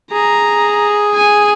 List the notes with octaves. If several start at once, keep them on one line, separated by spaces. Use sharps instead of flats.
G#4 A#5
G#5